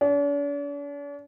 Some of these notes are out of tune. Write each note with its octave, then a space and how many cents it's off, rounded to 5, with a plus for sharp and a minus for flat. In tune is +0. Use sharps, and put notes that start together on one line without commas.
D4 -45